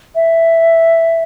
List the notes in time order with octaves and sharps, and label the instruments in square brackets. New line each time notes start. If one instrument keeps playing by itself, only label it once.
[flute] E5